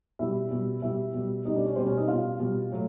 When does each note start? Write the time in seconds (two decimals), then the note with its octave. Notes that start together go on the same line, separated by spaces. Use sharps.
0.19 B2 G3 E4 E5
0.51 B2 G3
0.82 B2 G3 E4 E5
1.14 B2 G3
1.45 B2 G3 D#4 D#5
1.55 D4 D5
1.66 C#4 C#5
1.76 B2 G3 C4 C5
1.87 C#4 C#5
1.98 D#4 D#5
2.08 B2 G3 F4 F5
2.40 B2 G3
2.71 A2 F#3